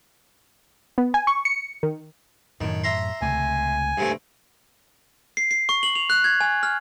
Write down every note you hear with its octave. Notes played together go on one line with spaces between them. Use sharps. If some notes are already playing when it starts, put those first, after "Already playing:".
B3
G#5
C#6
C#7
D#3
F#2 A2 D#3
E5 A#5 C6
C#2 C3 A3 G#5
G2 C3 A3
C7
C7
C#6
F#7
F7
F#6
G#6
G#5
F6